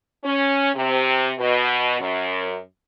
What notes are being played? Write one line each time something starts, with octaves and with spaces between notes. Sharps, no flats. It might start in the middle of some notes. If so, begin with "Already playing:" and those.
C#4
C3
B2
F#2